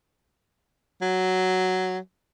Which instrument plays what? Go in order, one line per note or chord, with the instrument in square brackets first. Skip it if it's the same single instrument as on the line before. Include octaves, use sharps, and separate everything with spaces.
[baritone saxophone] F#3